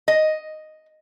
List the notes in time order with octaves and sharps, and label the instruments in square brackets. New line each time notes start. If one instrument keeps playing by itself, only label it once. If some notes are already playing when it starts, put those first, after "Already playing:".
[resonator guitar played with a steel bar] D#5